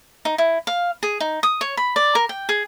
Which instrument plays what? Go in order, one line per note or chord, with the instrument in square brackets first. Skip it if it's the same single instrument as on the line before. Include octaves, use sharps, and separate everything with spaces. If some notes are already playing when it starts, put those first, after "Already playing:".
[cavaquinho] D#4
E4
F5
G#4
D#4
D#6
C#5
B5
D5
A#4
G5
G#4